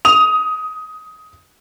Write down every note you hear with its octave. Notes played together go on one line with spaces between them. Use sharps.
D#6 F7